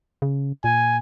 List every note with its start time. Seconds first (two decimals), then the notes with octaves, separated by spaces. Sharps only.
0.22 C#3
0.64 A#2 G#5